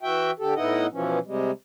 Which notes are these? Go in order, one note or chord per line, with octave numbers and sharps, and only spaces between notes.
E3 F#4 E5 G5
D3 G4 A4
A2 B3 D#4 E4 D#5 F#5
B2 E3 F3 C#4
C3 G3 G#3